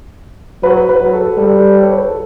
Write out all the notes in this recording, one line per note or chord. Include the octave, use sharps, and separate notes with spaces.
F#3 B4
B4
F#3
A4
G3 A4
C#5
B4
A4